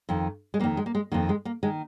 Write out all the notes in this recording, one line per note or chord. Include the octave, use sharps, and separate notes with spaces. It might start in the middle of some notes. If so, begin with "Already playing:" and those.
F2 D#3
G#3
F2 D#3 A#3
G#3
A#3
G#3
F2 D#3 A#3
G#3
A#3
D#3 G#3